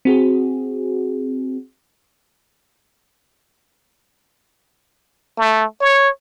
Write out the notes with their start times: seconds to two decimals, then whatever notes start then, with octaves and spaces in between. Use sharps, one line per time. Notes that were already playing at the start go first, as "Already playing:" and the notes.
0.05 C4 F#4 G#4
5.38 A3
5.81 C#5